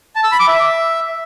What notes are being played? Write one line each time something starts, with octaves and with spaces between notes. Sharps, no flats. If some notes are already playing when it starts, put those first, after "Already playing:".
A5
E6
B5
D6
E5